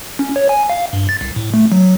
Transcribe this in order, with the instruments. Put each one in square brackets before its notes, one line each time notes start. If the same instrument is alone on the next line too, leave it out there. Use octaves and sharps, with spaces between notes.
[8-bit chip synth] C#4
C#5
G#5
F5
G2
A6
C2
A2
A3
F#3